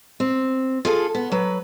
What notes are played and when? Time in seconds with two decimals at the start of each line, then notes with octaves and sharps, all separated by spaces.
0.20 C4
0.85 F4 G#4 A4
1.15 B3
1.32 F#3 B4